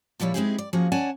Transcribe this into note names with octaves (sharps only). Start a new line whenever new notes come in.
A#2 F3 G3 E4 C#5
G#3 C4 D#4 E4 G4 G#4
D5
F3 A#3 C#4 F#4 G#4
C#4 C#5 D5 F#5 G#5 A5